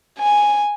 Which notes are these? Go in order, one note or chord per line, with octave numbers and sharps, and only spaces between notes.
G#5